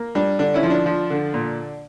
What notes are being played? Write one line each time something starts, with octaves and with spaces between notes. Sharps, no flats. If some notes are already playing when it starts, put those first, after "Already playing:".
Already playing: A#3
G3 D4
D3 D4
C#4 E4
F3
D4
F3
D3
A#2